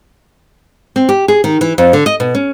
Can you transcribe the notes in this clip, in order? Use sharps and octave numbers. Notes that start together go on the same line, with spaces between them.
C4
G4
G#4
D#3
E3
F2
D3
D#5
B2
C#4